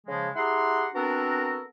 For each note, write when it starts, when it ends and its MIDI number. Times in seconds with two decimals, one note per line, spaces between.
0.07 0.30 49
0.07 0.30 53
0.07 0.30 56
0.36 0.87 64
0.36 0.87 67
0.36 0.87 68
0.36 0.87 78
0.36 0.87 82
0.36 0.87 84
0.95 1.61 59
0.95 1.61 60
0.95 1.61 62
0.95 1.61 66
0.95 1.61 69
0.95 1.61 70